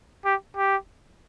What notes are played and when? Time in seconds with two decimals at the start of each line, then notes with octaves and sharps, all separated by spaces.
0.25 G4
0.57 G4